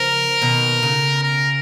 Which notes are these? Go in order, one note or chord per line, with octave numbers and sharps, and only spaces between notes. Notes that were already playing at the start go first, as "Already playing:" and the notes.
Already playing: C#3 F3 A#4
B2 D#3
C#3
A#4